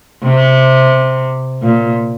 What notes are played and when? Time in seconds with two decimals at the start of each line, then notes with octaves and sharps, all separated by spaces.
0.23 C3
1.62 A#2